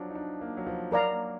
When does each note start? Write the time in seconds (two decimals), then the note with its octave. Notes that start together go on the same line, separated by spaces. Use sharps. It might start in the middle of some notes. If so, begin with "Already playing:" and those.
Already playing: F3 F#3 D4
0.10 D#4
0.15 D4
0.41 A#3
0.57 F#3
0.66 F3
0.91 F#3 A#4 D5 F5 A#5
1.11 A#3